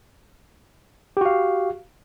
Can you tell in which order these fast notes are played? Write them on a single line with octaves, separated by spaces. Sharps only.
G4 F#4 F5